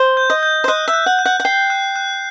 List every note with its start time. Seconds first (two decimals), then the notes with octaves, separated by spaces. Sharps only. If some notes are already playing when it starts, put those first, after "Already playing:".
Already playing: C5
0.17 G6
0.30 D#5
0.43 G6
0.64 C5
0.68 D#5 F#6
0.88 E5
0.93 F#6
1.06 F#5
1.19 F#6
1.26 F#5
1.40 F#5
1.45 G5 C7
1.70 F#6
1.96 F#6